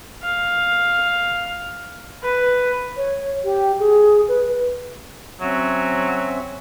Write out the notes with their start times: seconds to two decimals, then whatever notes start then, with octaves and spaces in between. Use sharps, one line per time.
0.24 F5
2.23 B4
2.97 C#5
3.44 G4
3.79 G#4
4.28 B4
5.41 F#3 C4 C#4 E5